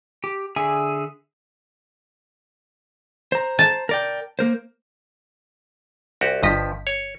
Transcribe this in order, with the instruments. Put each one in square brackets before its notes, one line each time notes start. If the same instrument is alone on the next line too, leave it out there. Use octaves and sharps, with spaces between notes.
[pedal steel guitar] G4
D3 G#4 E5 G#5
[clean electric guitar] C5 A#5
[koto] A5
[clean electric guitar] A#4 D5 G5
A#3 A#4 C5
[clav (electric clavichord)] C2 F#4 G4
[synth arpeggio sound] G1 D#5 B6 [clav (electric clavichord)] G2 F3
[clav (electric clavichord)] C#5